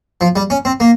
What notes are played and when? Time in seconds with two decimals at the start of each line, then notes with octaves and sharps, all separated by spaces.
0.21 F3
0.36 G3
0.50 C#4
0.65 C4
0.80 A#3